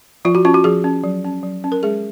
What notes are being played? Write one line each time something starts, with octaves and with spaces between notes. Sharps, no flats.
F3 F4
F#4
C#4 F4
F#4
F3 G#4
C#4
F#3
C#4
F#3
C#4
A#4
G#3 G#4